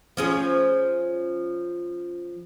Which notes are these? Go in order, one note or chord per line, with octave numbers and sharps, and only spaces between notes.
F3 C#4 G#4